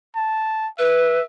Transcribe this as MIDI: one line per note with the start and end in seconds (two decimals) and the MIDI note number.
0.15 0.68 81
0.79 1.19 71
0.79 1.23 76